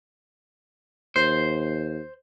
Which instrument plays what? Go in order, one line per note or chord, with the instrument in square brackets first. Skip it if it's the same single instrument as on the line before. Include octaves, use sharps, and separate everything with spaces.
[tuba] D#2 [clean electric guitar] C5